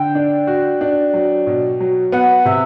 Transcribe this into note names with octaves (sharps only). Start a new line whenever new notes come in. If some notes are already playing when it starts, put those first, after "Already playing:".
Already playing: D3 G5
D4
F#4
D4
F#3
B2
F#3
B3 F#5
C3 E5